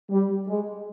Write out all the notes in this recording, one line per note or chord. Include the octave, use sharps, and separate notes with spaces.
G3
G#3